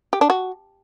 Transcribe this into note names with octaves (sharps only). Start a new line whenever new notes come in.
G4
D4
F#4